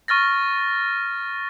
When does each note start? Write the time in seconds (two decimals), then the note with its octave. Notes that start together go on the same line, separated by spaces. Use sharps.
0.08 C#6 F6 A6 A#6